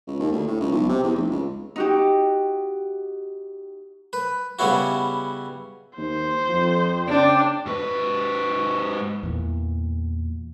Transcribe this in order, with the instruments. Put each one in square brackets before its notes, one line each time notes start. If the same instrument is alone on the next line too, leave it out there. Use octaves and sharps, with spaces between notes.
[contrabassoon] C#2
D#2
D2
A2
C#2
B1
C3
E2
F1
C#2
[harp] D#4 F#4 G4
[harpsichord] B4
C#3 G3 B3 C#4 E4 F#4
[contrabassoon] D#2 [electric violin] C5
[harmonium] F2 [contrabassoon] F3
[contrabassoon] C#3 [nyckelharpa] D4 [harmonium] D5 G5
[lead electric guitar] G#2 B4 [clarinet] F#4
[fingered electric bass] E2 A#2